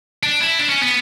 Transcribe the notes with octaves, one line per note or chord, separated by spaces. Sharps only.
D4
E4
D4
C#4
B3